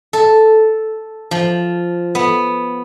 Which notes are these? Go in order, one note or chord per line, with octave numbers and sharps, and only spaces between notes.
A4
F3
B3